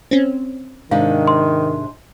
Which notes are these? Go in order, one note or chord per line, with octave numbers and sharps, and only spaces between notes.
C4 C#4
G#2 C3 D#3 D4 F5
C6